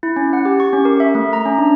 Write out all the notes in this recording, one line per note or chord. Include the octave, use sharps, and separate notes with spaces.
E4
C#4
F#5
G4
C#6
C#4
A#4
E5
A3
A#5
C#4
D4